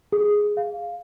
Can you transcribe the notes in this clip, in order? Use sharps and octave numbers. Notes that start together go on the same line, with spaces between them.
G#4
F5